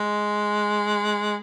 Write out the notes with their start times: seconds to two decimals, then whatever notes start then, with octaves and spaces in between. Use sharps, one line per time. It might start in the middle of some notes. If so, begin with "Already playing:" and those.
Already playing: G#3